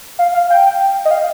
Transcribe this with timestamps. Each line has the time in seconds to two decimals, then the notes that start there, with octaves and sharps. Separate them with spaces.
0.19 F5
0.34 F5
0.50 G5
1.05 D#5
1.11 F5